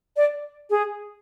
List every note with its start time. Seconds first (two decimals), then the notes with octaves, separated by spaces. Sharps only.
0.17 D5
0.70 G#4